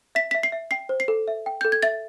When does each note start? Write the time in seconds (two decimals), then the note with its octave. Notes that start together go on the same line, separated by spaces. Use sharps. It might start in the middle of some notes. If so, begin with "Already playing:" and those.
0.15 E5 B6
0.31 E5 B6
0.43 C7
0.52 E5
0.71 G5 C7
0.89 C5
1.00 C7
1.08 A4
1.28 E5
1.46 G5
1.61 A4 G6
1.72 G#6
1.82 E5 A6